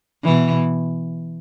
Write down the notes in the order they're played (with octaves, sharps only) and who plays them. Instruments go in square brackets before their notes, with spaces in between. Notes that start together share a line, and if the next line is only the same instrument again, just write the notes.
[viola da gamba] B2 E3